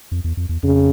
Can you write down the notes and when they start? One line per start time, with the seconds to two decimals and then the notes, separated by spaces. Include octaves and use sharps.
0.11 F2
0.24 E2
0.37 F2
0.49 E2
0.62 F2 C#3